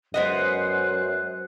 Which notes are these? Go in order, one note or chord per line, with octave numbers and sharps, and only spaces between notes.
F#2 G#3 B3 C5 D#5 F#6